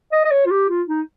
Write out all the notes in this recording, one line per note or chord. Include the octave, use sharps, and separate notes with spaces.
D#5
D#5
C#5
F4
G4
F4
D#4